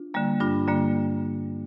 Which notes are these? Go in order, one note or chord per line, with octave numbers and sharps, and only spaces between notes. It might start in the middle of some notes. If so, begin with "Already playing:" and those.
Already playing: D4 F4
D3 G3 A#3
G2 D4 F4
D3 G3 A#3